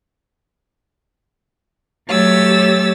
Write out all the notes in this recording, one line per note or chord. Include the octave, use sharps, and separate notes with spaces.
F#3 A3 G4 C#5 E6 A6